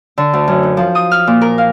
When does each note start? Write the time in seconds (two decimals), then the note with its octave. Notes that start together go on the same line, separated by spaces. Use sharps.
0.18 D3
0.34 D2
0.48 F#2
0.63 D#4
0.77 F3
0.95 D#6
1.11 F6
1.27 A#2
1.41 A#4
1.58 F5